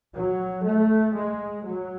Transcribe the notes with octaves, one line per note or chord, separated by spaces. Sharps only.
F#3
A3
G#3
F#3